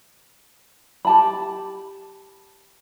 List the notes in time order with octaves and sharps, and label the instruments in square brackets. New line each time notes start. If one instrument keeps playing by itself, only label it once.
[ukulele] G4 A5 B5